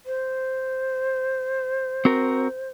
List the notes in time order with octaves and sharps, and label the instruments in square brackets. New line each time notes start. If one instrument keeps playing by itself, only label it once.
[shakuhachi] C5
[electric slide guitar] C4 F#4 A#4